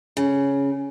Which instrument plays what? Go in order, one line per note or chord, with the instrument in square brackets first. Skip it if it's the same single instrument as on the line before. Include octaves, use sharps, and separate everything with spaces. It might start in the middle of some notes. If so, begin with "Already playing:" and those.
[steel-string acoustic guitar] C#3